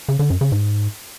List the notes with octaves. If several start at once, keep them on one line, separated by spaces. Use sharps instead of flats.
C#3
D3
F#2
C#3
G#2